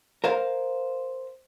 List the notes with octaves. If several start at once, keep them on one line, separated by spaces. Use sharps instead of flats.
A#4 C5 F5